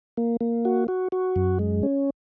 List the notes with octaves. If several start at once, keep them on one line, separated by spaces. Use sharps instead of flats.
A#3
A#3
F#4
F#4
F#4
F#2
G#3
C#4